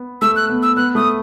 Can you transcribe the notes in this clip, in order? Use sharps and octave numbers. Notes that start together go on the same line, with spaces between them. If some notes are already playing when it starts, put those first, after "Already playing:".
Already playing: B3
A3 E6
F#6
B3
E6
B3 F#6
A3 D#6